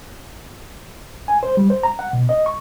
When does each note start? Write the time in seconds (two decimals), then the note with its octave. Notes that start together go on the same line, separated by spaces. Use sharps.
1.28 G#5
1.43 C5
1.57 G3
1.70 C5
1.83 A#5
1.99 F#5
2.13 B2
2.29 D#5
2.46 C#6